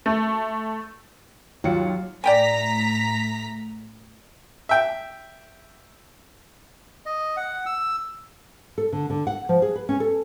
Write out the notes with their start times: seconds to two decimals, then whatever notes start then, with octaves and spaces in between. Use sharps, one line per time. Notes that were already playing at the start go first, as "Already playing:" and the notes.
0.06 A3
1.64 D#2 F#3 F4 C#7
2.24 A2 D5 G5 G#5 A#5 B6
4.69 E5 G5
7.06 D#5
7.37 F#5
7.66 E6
8.78 A4
8.92 D3
9.10 D3
9.27 F#5
9.49 F3
9.62 G#4
9.76 B4
9.89 C#4
10.00 A4